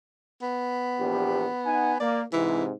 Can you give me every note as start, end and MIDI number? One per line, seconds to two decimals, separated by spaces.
0.42 1.98 59
0.99 1.47 34
0.99 1.47 40
0.99 1.47 67
1.65 1.94 63
1.65 1.94 78
1.65 1.94 80
2.00 2.24 58
2.00 2.21 74
2.33 2.72 44
2.33 2.72 48
2.33 2.64 52